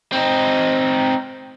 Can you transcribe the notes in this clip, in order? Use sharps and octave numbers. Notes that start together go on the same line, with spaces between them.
C4 D#4